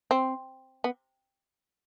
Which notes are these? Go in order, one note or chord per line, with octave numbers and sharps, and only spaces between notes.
C4
B3